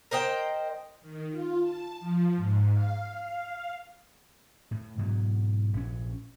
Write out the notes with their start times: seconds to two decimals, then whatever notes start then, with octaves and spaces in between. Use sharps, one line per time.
0.11 A#4 C5 D#5 G5
1.01 D#3
1.31 F4
1.61 A5
2.00 F3
2.36 G#2
2.73 F5
3.20 F5
4.71 A2
4.98 G#2 B2 F#3
5.73 A#1 C#4